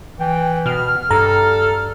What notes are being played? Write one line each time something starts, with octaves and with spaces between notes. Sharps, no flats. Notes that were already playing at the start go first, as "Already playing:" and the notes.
E3 G5
B2 F6
G2 A4 A#5